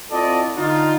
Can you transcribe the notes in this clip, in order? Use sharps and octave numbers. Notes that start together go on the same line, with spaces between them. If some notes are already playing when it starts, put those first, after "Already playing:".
C4 E4 F4 A4 D5 D#5
D3 D#4 F4